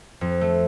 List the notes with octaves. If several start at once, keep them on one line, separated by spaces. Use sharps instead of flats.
F2
A3